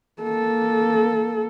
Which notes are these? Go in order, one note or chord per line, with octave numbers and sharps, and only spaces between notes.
A#3 A4